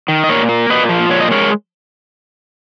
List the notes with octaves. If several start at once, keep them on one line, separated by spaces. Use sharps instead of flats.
D#3
D#5
A#2 A#4 C#5
A#3
A#2 B4 D#5
F3
A#2 C#5
D#5
G#3 A#4 C#5